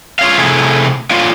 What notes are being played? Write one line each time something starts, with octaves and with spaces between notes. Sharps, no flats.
F4 C#5 F5
C3 A3 E4 G#4
A#3 D4 F4 C#5 F5